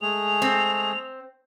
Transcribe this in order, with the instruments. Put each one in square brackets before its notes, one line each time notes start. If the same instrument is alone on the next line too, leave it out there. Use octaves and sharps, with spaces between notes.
[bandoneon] G#3 A3 G#4 [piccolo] F7
[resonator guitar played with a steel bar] C4